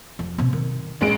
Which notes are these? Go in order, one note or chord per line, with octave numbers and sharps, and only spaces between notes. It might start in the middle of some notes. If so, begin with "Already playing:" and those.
F2
B2 C4
D#3
A1 G#3 D7